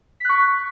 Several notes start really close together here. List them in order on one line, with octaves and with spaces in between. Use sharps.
B6 F#6 C#6